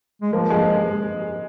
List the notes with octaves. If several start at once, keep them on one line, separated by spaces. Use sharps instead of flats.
G#3
F3 A#3
G#3